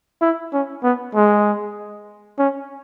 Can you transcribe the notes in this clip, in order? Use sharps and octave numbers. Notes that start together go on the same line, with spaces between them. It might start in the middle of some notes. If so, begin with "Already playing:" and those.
E4
C#4
B3
G#3
C#4